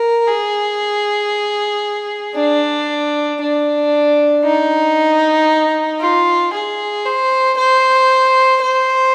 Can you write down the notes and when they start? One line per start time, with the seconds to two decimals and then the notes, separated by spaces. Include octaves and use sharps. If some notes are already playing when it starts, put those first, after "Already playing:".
Already playing: A#4
0.27 G#4
2.35 D4
3.41 D4
4.44 D#4
6.00 F4
6.53 G#4
7.06 C5
7.57 C5
8.61 C5